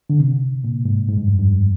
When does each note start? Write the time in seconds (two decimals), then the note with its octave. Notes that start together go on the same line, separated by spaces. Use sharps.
0.10 D3
0.20 C3
0.64 A#2
0.85 G#2
1.08 G#2
1.17 G2
1.28 F2
1.39 G2